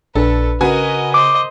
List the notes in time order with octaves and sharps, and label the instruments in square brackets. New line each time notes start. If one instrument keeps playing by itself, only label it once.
[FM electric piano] A#1 D4 [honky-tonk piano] A4 [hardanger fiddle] B4
[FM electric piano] C#3 [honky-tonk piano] F#4 B4 G#5 [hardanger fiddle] A#4 D#5
[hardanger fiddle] C5 D#5 [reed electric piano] D6